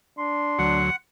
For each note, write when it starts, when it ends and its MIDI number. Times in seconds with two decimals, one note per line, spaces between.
0.18 0.80 62
0.18 0.93 84
0.59 0.90 38
0.59 0.90 54
0.59 0.96 78